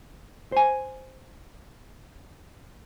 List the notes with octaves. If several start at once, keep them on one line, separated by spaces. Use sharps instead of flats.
C5 G#5